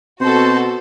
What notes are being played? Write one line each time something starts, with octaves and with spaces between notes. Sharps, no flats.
B2 C4 F#4 A4 C5